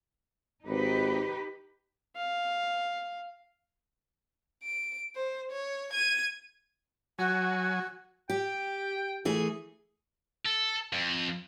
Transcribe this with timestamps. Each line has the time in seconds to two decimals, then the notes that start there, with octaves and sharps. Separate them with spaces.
0.67 G#1 D#4 G4 B4
2.16 F5
4.63 D7
5.15 C5
5.51 C#5
5.93 G#6 D#7
7.19 F#3 F#4 G#5
8.30 G4 G5
9.25 E3 A3 G#4
10.46 A4
10.93 F2